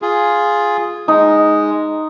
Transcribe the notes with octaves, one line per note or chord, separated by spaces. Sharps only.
F4 G#4
G#3 D#4